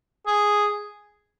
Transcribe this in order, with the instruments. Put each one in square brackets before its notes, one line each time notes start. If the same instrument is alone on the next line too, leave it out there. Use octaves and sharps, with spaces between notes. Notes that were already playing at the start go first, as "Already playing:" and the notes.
[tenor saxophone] G#4